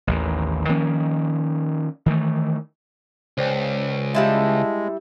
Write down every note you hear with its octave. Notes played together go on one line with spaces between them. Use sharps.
A1 D#2 D#3
D#3 F3 A#3 C#4
D#3 E3 A3
C#2 C5 D5 G5
G3 G#3 E4 E5 F5 A5